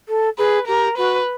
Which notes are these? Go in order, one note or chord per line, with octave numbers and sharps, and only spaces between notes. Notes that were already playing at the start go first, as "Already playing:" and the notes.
A4
G#4 B4
G4 A#4
F#4 B4